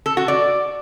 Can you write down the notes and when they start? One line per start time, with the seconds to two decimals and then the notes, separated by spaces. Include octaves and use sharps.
0.06 A4
0.17 F#4
0.28 D5